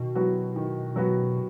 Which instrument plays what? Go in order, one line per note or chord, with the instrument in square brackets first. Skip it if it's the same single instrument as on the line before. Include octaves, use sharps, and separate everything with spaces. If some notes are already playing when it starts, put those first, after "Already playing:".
Already playing: [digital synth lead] B2 [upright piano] D#3
[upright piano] F#3 B3 F#4
D#3
F#3 B3 F#4